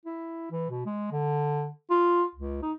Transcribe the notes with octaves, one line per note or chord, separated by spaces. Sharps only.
E4
E3
B2
G#3
D3
F4
C#2
D#4